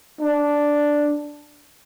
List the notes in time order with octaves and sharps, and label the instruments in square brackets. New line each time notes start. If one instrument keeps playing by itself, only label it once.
[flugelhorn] D4